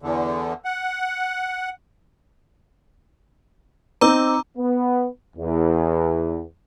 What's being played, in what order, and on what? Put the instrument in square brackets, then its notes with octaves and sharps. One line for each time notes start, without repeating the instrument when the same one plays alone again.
[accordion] E2 D3
F#5
[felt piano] C4 D#4 [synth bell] A#5 D6 E6
[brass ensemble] B3
E2